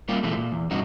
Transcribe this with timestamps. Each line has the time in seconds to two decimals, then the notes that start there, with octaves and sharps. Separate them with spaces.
0.08 G3 A#3 F4 G4
0.23 B2 E3 F3 G#3 A3
0.36 A#2
0.52 E2
0.71 G2 B2 D#4 F#4